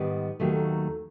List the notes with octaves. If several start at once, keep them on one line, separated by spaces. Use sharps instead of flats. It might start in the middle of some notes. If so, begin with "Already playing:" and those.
Already playing: G#2 D#3 G3 B3
D#2 D#3 F#3 A3